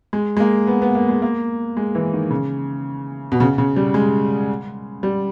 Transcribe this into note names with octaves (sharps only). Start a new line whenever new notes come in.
G#3
G#3
A#3
B3
B3
A#3
G#3
A#3
G#3
E3
D#3
C#3
B2
C#3
C#3
G3
G#3
G3